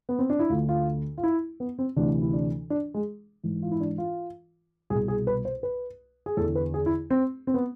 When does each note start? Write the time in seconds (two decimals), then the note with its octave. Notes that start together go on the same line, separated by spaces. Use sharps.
0.09 B3
0.19 C4
0.30 D4
0.39 E4
0.49 D2 D3 F4
0.69 F4
1.18 F4
1.23 E4
1.60 B3
1.79 C4
1.96 D2 C3 E3 D4
2.21 E4
2.33 D4
2.70 D4
2.94 G#3
3.44 G#2 E3
3.63 F4
3.71 E4
3.80 D4
3.98 F4
4.90 C2 G#4
4.95 B2
5.08 G#4
5.27 B4
5.45 C5
5.63 B4
6.26 G#4
6.37 E2 D3 A4
6.55 B4
6.74 G#4
6.86 E4
7.10 C4
7.47 C4
7.54 B3